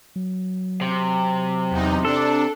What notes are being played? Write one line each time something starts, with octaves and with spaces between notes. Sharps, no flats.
F#3
C3
E2 D#4
D4 A4